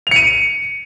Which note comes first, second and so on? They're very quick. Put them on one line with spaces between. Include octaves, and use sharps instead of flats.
F7 C#7 D#7